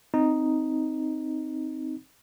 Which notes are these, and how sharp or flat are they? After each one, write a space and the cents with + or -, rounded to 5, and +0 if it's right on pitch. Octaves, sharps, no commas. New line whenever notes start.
C4 +0 D#4 +0